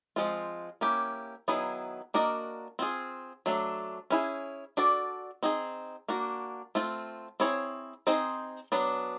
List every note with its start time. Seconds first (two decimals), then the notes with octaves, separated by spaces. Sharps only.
0.16 F3 G#3 C4 F4
0.81 A#3 C#4 E4 G4
1.48 D#3 F#3 B3 E4 G#4
2.14 A#3 D4 F#4 A#4 D#5
2.79 C4 F4 G#4
3.46 F#3 A3 D4
4.10 C#4 E4 G#4
4.77 D4 F#4 A4 D5
5.43 C4 D#4 G#4
6.08 A#3 D4 F#4
6.75 A3 C4 F4
7.40 C4 E4 G#4 C#5
8.07 C4 D#4 G#4 C5
8.72 F#3 B3 D4